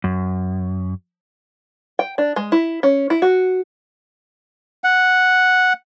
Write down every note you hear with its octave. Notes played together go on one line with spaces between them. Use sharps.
F#2
G5
D4
G#3
E4
C#4
E4
F#4
F#5